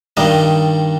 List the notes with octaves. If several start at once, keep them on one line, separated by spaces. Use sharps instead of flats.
G2 D#3 G3 D#5